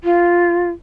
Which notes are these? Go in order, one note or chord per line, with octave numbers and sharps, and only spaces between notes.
F4